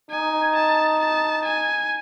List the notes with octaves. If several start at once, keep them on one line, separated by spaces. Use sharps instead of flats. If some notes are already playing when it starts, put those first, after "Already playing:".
D#4 G#5
A5
A5
G#5